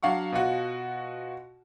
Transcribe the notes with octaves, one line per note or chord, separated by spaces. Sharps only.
F#3 D4 F5 F#5 C#6
B2 F4 F#4